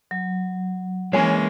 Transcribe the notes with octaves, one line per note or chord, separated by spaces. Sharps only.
F#3
E3 G#3 A#3 C#4 C#5 G#5